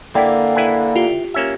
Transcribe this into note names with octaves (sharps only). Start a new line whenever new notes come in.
D3 A#3 E4 D5 G5
E4 B4 G#5
F4 G4
A#3 C#4 E5